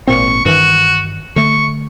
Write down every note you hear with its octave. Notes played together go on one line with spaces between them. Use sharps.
G#1 A#2 C4 C#6
G2 D#3 E3 F#4
D3 A3 C#6